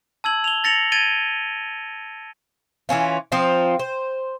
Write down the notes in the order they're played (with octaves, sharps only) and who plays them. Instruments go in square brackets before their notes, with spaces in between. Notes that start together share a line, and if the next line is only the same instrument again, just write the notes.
[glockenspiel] A5 E6 G#6 F#7
F7 G7
A6 A#6 C#7 F7 F#7
G#6 A6 D7 D#7 G7
[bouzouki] E3 G3 C#4 F4
F3 C4 D#4 F4
C5